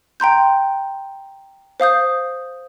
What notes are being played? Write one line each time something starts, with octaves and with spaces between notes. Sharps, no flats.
G5 A#5 C6 G6
C5 F5 D#6 G6